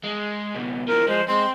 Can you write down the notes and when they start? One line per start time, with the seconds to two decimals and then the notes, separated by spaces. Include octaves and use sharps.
0.04 G#3
0.54 C#2 B2
0.88 D#2 F3 A#4
1.07 F3 G#3 C5
1.28 G#3 C4 C6